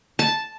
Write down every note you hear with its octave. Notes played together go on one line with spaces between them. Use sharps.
A5